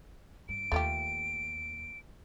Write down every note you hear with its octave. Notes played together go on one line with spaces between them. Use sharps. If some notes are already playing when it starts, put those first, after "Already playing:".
G2 D7
D#2 A3 F4 G4